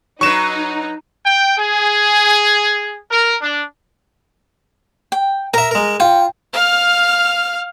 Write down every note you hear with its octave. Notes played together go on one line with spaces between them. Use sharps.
F#3 D#4 B4 C#6 E7
G5
G#4
A#4
D4
G5
A#4 E5 A#5
G#3 A#4
F4 G5
F5 F6